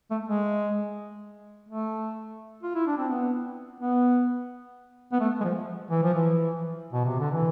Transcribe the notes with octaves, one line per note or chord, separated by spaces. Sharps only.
A3
G#3
A3
F4
E4
D4
C4
B3
B3
B3
A3
G#3
F3
E3
F3
E3
B2
C3
D3
E3